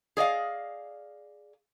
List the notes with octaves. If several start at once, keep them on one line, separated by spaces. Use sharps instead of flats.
G#4 D5 D#5 F5